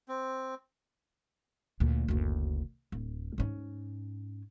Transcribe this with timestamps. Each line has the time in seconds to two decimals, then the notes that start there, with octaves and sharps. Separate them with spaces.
0.08 C4
1.80 D2 A#2
2.08 F#1 D2
2.92 D1
3.38 G#2 C#4